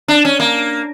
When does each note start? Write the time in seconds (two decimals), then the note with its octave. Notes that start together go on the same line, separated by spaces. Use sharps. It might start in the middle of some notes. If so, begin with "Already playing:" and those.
0.08 D4
0.25 C#4
0.40 A#3